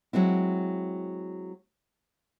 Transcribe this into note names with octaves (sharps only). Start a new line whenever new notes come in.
F#3 G#3 C4 E4